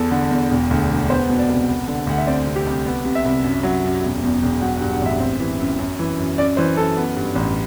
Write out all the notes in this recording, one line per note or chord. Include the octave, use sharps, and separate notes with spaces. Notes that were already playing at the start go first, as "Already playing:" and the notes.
Already playing: E2 A4
D3
E2
E1
D2
E1
B3 C5
B2
D5
C2
B3
D3
D2 F#5
E5
C4 D5
C3
G4
C2
B3
C3
E5
C2
F#2
F#3
F#2
E1
E2
E1
F#3 F#5
F#5
G2
F#5
A1 E5
C4
E3
F#2
F#2
E3
F#2
F#2 D5
E3 C5
F#2 A4
B3
G2
A1